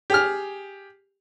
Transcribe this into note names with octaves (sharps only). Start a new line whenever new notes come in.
G4 G#4 F6